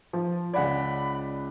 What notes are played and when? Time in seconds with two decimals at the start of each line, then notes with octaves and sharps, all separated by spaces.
0.13 F3
0.53 C#2 D5 F#5 B5 G#6